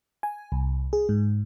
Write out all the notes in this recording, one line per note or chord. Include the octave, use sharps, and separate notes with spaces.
G#5
C2
G#4
G#2